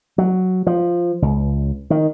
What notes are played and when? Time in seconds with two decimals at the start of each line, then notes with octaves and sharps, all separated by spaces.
0.18 F#3
0.67 F3
1.22 C#2
1.90 D#3